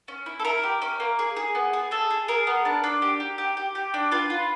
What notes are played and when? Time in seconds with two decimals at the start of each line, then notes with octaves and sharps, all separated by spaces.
0.08 C#4
0.26 E4
0.40 A4
0.45 E4 A#4
0.63 G4
0.82 C#4
1.00 A#3
1.19 G#4
1.37 G#4
1.55 B3
1.73 G#4
1.91 G#4 A4
2.10 G#4
2.28 G#4 A#4
2.47 B3
2.65 D4
2.84 D4
3.02 G4
3.20 G4
3.38 G4
3.57 G4
3.75 G4
3.94 D4
4.12 F4 B4
4.30 F4